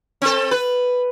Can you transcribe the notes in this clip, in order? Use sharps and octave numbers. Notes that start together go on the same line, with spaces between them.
C4 A4
B4